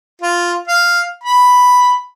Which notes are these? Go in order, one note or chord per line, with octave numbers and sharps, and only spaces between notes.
F4
F5
B5